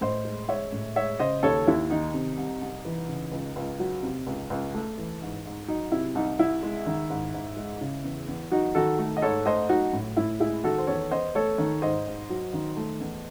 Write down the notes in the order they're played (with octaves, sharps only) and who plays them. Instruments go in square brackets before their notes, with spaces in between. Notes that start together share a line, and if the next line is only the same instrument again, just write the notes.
[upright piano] A2 C5 D#5
G#3
G#3 C#5 E5
A2
G#3 C#5 E5
C#3 C5 D#5
D#2 A4 C#5
D#2 E4
D#3 D#4
C3
C2
C2
E3
C#3
C#2
C#2
F#3
C3
C#2
C#2
A3
E3
G#2
G#2
F#3 D#4
C3 E4
C2 D#4
C2 E4
G#3
D#3
G#2
G#2
G#3
C#3
E2
E2
F#3 D#4 F#4
D#3 F#4 A4
A3
D#5
G#2 A4 C#5
A3 C5 D#5
F#3 D#4 F#4
A2
A2 E4
G#3 E4 G#4
D#3 F#4 A4
C5
E2 A4 C#5
E2 C5 D#5
A3 A4 C#5
D#3
G#2 C5 D#5
G#2
F#3
D#3
A3
E2